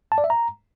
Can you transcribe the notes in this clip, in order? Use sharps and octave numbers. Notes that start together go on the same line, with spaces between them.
A5
D5
E5
A#5